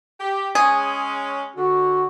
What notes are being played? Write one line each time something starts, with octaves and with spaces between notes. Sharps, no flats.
G4
G#3 C#4 G#4
D3 F#4